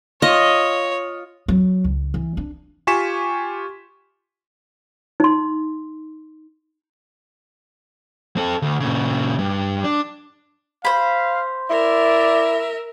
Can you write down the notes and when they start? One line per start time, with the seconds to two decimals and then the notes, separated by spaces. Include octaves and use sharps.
0.22 F4 C#5 D#5
1.48 F#3
1.84 C#2
2.14 E3
2.37 D4
2.87 F4 G4 G#5 C#6 B6 E7
5.20 D#4 C6
8.37 C4 A4
8.62 D2
8.80 A#2 C#3
9.39 G2
9.84 D4
10.85 C5 F5 B5
11.70 E4 A#4 D5 E5